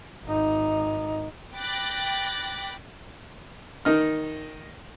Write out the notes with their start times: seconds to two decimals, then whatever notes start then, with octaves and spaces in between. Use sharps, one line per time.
0.25 G#1 D#4
1.56 G5 B5 D6 F#6 A6 A#6
3.85 D#3 D#4 F6